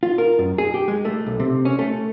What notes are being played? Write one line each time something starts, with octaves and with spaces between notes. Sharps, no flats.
F4
A#4
F#2
G#4
G4
G#3
A3
B1
C3
C#4
A3